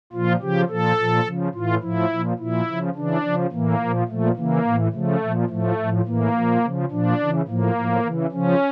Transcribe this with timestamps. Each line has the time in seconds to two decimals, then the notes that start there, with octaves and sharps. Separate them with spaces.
0.13 A#2 F3 F4
0.41 C#3 F3 G4
0.69 A#2 F3 A4
0.97 A#2 F3
1.25 C#3 F3
1.54 A2 E3 F4
1.82 A2 F3 E4
2.10 A#2 F3
2.39 A#2 F3 E4
2.67 C#3 F3
2.95 C#3 E3 D4
3.23 C#3 F3
3.52 A2 E3 A#3
3.80 A#2 F3
4.08 A#2 F3 A3
4.36 C#3 E3 A#3
4.65 A2 E3
4.93 C#3 F3 A3
5.22 A#2 F3
5.50 A2 F3 A3
5.78 A2 F3
6.06 A2 E3 A#3
6.34 A#2 F3
6.63 C#3 F3
6.91 A#2 F3 D4
7.19 C#3 E3
7.47 A2 F3 A#3
7.76 A2 F3
8.04 C#3 E3
8.32 C#3 F3 C#4